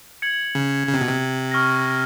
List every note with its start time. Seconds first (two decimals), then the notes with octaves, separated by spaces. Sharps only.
0.22 G#6 C#7 F#7
0.55 C#3
0.87 C#3
0.94 C3
1.01 B2
1.08 C3
1.51 C#6 F6 A#6